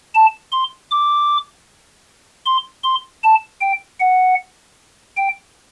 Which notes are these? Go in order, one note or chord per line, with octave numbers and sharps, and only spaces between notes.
A5
C6
D6
C6
C6
A5
G5
F#5
G5